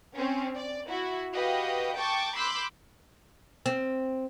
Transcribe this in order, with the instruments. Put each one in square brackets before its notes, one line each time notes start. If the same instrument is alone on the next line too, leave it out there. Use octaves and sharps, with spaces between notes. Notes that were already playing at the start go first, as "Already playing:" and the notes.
[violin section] C4 C#4
D5
E4 F#4
F#4 G4 B4 D#5 F5
G5 A5 C#6 D6 A6
B5 C6 D6 E6 F#6 G6
[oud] C4